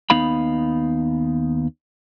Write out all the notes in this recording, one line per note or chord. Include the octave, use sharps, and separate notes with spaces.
D#2 B3 D#4 F5 B5